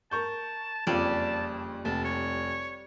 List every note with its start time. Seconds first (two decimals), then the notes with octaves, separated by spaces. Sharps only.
0.11 A#4 A5 C#6 G6
0.87 F#1 F2 G3 F4 A5
1.85 F1 A5
2.05 C#5